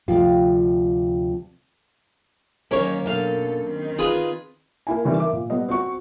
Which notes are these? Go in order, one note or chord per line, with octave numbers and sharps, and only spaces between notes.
D2 C3 F3 F4 F5 G5
D#3 F#3 A#3 C#4 C#5
F#2 B2 D4 A4 A#4 F5
D#3 C4
D#4 F4 G#4 B4
A#3 E4 G#5
D#3 E3 G3 C4
A#4 E5 D6
A#2
G3 B3 D#5
C4 F#4 C#6